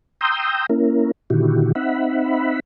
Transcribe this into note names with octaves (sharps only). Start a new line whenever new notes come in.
G5 A#5 C6 D#6 E6 G6
A#3 C#4 E4 A#4
A#2 D3 D#3 E4 F#4 G4
C4 D#4 E5 F#5 B5